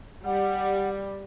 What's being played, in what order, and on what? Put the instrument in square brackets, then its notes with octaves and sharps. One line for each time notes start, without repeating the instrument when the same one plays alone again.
[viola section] G3 [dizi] F#5